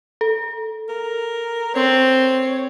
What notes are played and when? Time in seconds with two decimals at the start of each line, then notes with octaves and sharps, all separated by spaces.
0.21 A4
0.89 A#4
1.75 C4 C#5